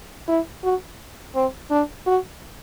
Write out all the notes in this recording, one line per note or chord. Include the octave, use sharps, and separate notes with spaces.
E4
F#4
C4
D4
F#4